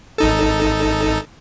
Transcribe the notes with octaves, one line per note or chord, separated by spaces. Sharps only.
G#1 D#4 A4